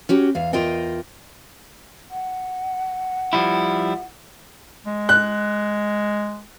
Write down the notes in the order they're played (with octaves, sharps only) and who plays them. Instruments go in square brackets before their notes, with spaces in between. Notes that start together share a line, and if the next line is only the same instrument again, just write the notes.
[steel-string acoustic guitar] C#4 F#4 G4
E2 F5
E2 F4 A#4 D#5 G5
[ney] F#5
[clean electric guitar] F3 G3 E4
[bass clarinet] G#3
[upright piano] F#6